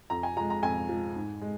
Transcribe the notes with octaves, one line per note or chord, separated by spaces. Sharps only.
F2 A#5
G#5
F3 G#3 A#5
A#5
F2 G#5
F3 G#3
G#2
G#3